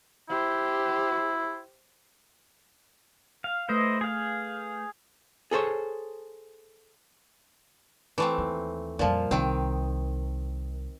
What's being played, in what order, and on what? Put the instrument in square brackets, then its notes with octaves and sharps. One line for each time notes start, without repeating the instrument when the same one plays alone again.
[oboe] E4 [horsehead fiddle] G4 C5
[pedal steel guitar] F5
[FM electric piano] A3 B4 G6 [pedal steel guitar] E4 C5 D#5
[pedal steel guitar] G#4 F5
[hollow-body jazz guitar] G#4 A4 C5 C#5
[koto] E3 A3 C4
[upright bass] D#2
[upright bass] F2 G3 [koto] A#2 F3
[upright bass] C2 [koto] D#3 C4